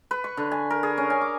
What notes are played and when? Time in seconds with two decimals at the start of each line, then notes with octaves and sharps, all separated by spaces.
0.11 B4
0.24 C#6
0.37 D3
0.51 G#5
0.70 A#4
0.83 G#4
0.98 C#4
1.10 G#5
1.21 D6